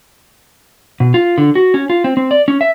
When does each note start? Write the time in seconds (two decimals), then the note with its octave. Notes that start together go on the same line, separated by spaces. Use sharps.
1.00 B2
1.14 F4
1.38 D3
1.55 F#4
1.74 C#4
1.90 F4
2.04 C4
2.17 C4
2.31 D5
2.48 C#4
2.61 E5